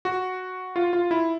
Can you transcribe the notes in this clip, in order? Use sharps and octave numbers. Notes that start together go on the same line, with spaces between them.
F#4
F4
F4
E4